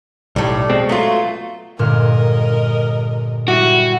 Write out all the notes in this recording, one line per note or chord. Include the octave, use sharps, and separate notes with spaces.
B1 A2 G3 A3
B2 G#3 C4
F#3 A3 B3 F4
G1 A#2 A#4 D#5 F6
G3 E4 F#4